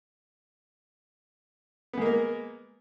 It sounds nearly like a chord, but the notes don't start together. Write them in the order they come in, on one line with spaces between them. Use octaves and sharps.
B3 G#3 A#3 A#4